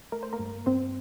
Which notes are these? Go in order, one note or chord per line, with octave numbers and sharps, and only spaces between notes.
A3 A#4
C5
A#3 A#4
G2
G2 C4 C5